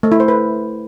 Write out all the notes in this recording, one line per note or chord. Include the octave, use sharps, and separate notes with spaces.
A3
E4
C5
B4